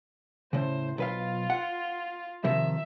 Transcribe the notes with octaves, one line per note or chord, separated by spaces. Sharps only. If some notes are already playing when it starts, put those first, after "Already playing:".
A2 C#3 C5
B1 F4 B4 F5
F#5
C3 D#3 F3 E5